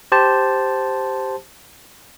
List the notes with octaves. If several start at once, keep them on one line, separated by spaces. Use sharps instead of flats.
G4 C5 A5